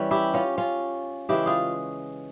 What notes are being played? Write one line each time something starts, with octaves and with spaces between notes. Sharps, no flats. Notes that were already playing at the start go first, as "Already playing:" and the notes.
Already playing: E3 G3 C#4
E4 G4
C#4 F4
C#4 F4
C#3 E3 G#3 C#4 E4 G4
F4 G#4